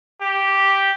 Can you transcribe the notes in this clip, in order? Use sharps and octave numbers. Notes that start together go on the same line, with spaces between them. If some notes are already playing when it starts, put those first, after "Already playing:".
G4